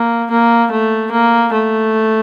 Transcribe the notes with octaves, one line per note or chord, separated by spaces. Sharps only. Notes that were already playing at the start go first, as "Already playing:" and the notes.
Already playing: A#3
A#3
A3
A#3
A3